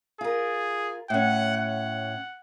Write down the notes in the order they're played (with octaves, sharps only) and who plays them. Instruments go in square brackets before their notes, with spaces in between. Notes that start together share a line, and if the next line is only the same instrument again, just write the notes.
[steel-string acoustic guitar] F4 A#4 [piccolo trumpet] G#4
[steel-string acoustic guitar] A2 C#4 [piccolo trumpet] F#5
[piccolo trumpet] F#5